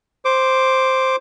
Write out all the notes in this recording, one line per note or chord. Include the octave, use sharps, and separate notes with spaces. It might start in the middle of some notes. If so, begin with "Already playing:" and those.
C5 D6